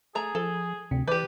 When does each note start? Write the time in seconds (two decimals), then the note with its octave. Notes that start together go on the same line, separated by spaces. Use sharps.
0.15 A3 G#4 A#5
0.35 F3 A4
0.91 D2 C3
1.08 E3 G4 B4 D5 G6